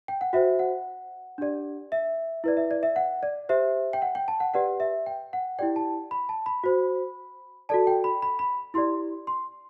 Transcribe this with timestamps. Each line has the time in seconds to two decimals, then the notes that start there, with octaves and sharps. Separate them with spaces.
0.08 G5
0.21 F#5
0.33 F#4 C5 E5
0.59 F#5
1.38 D4 G4 D5
1.92 E5
2.44 E4 B4 D5
2.57 E5
2.71 D5
2.83 E5
2.96 F#5
3.23 D5
3.49 G4 C5 E5
3.93 G5
4.02 F#5
4.15 G5
4.28 A5
4.40 F#5
4.54 G4 B4 D5 F#5
4.80 E5
5.06 G5
5.33 F#5
5.59 E4 G4 D5 G5
5.76 A5
6.11 B5
6.29 A5
6.46 B5
6.64 F#4 C5
7.69 F#4 A4 D5 A5
7.87 G5
8.04 B5
8.22 B5
8.39 B5
8.74 E4 G4 D5 C6
9.27 C6